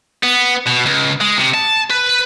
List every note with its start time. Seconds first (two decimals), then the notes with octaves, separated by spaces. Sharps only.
0.23 B3
0.66 B2
0.85 C#2
1.21 G#3
1.37 C3
1.54 A5
1.90 B4